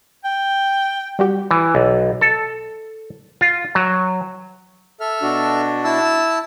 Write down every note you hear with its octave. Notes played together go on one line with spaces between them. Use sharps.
G5
G3 F#4 G4
E3
B1
A4
F4
F#3
A4 E5 F6
B2 D4 F#4
E4 A5 E6